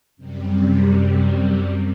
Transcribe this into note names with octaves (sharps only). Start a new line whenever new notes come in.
F#2 C3 G3